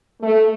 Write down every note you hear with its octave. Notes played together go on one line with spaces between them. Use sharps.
A3